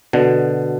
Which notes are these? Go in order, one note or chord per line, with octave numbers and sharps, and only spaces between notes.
B2 D3